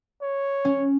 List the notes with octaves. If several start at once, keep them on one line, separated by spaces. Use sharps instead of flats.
C#5
C#4